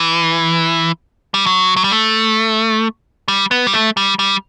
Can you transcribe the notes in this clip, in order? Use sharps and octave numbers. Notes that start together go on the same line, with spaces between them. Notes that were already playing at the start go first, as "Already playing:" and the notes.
Already playing: E3
G3
F#3
F#3
G3
A3
G3
B3
G3
A3
G3
G3